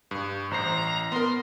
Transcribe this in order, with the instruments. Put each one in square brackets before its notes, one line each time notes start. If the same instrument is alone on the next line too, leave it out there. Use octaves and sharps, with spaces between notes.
[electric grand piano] G2
[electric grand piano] A1 C5 C7 [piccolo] A#5
[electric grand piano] B3 A#4 [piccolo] C6